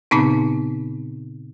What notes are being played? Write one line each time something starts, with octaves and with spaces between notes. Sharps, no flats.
A#2 C#3 B3 C4 D#4